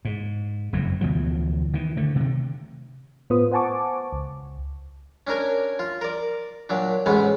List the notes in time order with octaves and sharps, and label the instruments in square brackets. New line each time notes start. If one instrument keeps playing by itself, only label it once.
[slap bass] G#2
F#1 F2 G#2
D2 B2 E3 F3
D#3 E3
D3 A3
C3 D#3
[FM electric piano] A2 B3 F4 B4 C5 D#6
C5 F#5 G#5 A5 C#6 D6
C#2
[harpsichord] C#4 D4 A#4 G#5
F4
A#4 D5
A#2 F#3 D4
A1 G#2 G#3 B3 C#4 B4